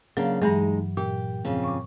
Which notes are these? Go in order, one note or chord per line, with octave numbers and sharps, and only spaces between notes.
C#3 F#3 A#3 D4
G2 E3 F#3 G#3 D#4
A#2 G4
F2 C#3
C#6 D6